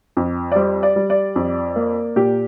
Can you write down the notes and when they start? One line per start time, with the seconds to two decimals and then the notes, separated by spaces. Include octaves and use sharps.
0.17 F2
0.52 D5
0.56 G3 C5
0.83 D5
0.96 G3
1.10 D5
1.36 F2
1.76 A#3
2.16 A#2 G4